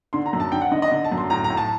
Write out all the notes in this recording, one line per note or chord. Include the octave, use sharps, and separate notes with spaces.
D3 C6
A#5
F#2
A5
D3 G5
F#5
D3 D#5
D#5
D3
A5
F#2
C6
A2 A#5
A#5
A2
A5